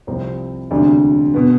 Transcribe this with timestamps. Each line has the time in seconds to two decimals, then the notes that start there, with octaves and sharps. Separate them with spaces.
0.07 C2 C3 F3 C4
0.70 E1 D2 C3 G3 D4
1.34 B2 B3